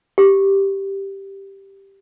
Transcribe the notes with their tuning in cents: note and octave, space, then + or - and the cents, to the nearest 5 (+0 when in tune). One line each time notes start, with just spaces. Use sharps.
G4 +0